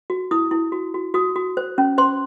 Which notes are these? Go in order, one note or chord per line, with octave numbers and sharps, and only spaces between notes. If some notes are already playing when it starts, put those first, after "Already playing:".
F#4
E4 D#6
E4
F#4
F#4
F#4 D#6
F#4
C5
C#4
C5 C6